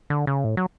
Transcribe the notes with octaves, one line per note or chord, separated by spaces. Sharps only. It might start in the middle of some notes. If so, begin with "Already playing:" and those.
D3
C#3
A2
F#3